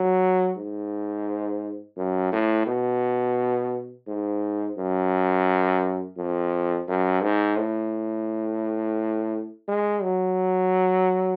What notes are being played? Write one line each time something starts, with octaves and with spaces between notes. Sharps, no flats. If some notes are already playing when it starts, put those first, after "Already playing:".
Already playing: F#3
G#2
F#2
A2
B2
G#2
F#2
F2
F#2
G#2
A2
G#3
F#3